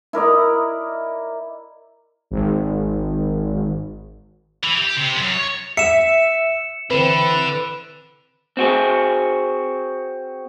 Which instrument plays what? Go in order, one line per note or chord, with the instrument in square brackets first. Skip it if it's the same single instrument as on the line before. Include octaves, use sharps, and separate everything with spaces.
[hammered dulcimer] E4 A#4 D5 D#5
[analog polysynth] G#1
[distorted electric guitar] E3
G4
C3
F#2
C#5
[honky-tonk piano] E5 [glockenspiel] C#7 E7
[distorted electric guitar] D3 [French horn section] E3 C4 [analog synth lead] B4
[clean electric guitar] C4 F#4 G#4